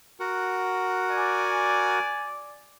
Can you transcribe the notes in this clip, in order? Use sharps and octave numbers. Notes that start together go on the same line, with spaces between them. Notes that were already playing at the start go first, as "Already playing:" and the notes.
F#4 A#4 F#5
D5 G#5